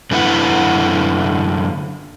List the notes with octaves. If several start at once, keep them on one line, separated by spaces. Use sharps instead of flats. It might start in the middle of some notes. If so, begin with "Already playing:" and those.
F#2 D3 E4 B4 F#5